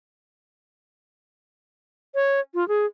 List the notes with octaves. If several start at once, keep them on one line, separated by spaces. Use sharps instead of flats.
C#5
F4
G#4